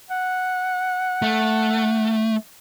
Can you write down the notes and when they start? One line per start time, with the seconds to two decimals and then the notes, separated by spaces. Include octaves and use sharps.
0.10 F#5
1.22 A3